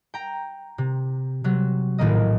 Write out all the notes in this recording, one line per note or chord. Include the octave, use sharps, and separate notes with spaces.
G5 A#5
C3
C3 F#3
A#1 A2 D#3 A#3 D#5